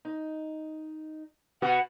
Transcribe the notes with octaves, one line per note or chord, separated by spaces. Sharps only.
D#4
B2 B3 F#4 F#5